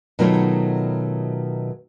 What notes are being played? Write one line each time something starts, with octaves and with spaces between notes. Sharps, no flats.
B2 D#3 F#3 A3 F4 C#5